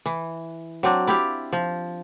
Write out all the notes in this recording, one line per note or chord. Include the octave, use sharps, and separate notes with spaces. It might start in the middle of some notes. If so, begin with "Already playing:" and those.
E3
F#3 C4 D4
E4 G4 D5 F5
F3